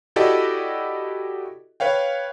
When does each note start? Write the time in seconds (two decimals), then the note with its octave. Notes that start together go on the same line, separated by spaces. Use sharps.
0.16 E4 F#4 G4 A4 D5 D#5
1.80 B4 C#5 F5 G5